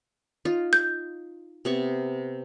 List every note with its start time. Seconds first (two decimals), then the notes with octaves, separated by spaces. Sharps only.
0.45 D#4 F4
0.73 G6
1.65 C3 B3 C#6